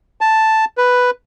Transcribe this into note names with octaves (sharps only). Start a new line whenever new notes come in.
A5
B4